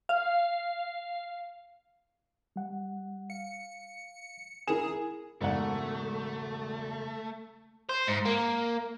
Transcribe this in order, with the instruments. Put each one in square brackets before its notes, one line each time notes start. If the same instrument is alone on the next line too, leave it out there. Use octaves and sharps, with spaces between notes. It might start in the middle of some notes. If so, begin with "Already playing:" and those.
[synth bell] F5
[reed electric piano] G3 F#5
[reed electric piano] F5 [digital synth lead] C#7
[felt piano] E4 A#4 E7 [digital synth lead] G#4 [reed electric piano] G#5
[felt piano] E1 E2 D5 [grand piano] G#2 F#5 [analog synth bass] C#3 [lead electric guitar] A3
[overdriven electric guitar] C5
G#2
A#3